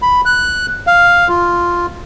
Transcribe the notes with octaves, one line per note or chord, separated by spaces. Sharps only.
B5
F#6
F5
F4